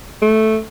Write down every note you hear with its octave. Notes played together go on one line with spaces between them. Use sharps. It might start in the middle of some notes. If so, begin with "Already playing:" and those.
A3